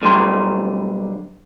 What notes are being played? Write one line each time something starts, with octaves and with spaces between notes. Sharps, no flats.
B1 D3 G3 C6